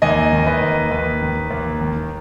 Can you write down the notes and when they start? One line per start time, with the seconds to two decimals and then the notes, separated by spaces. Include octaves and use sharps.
0.02 D#2 D#5 G#5
0.33 D#3
0.46 B4 D#5
0.61 D#2
0.91 D#2 B4
1.22 D#3
1.51 D#2
1.81 D#3